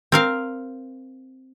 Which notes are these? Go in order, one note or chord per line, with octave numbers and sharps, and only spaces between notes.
C4 A#4 F5